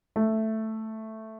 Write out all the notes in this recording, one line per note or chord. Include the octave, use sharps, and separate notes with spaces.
A3